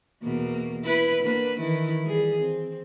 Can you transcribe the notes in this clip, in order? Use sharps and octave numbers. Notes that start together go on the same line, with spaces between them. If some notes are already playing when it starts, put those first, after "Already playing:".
E2 B2 A#3
E4 B4
D3 A#3 B4
D#3 E3 E4
G3 G#4
C4